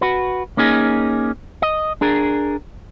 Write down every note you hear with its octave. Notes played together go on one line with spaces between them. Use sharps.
F#4 B4
A#3 C#4 D#4 G#4
D#5
D4 G#4 A#4